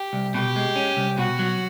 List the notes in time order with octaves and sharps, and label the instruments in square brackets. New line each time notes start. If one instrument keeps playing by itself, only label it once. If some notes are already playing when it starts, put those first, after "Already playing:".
Already playing: [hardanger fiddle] G4
[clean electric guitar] C2
[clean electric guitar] B2 [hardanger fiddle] G4
[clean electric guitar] G#3
C#4
C2
[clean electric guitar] B2 [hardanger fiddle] F#4
[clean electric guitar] F#3